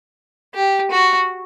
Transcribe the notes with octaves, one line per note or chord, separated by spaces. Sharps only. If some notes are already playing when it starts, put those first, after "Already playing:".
G4
F#4